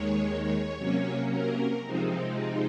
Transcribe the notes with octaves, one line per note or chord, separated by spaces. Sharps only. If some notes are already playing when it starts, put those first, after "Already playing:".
Already playing: D#2 D#3 G#3 C#5
C3 F#3 A#3 C#4
A#4
C3 F3 G#3 C4 D#4
D#4